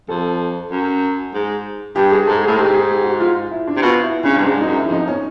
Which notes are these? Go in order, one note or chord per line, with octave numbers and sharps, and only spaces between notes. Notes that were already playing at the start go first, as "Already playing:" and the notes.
F2 A4
F#2
G#2
G2 G4
G#4
G#2 A4
A2 G#4
G#2 G4
G#4
G4
F#4
F4
E4
D4
C3
B2 F4
E4
C#3 D4
G2
G#2 D4
F#2 D#4
E4
F2 D#4
C#4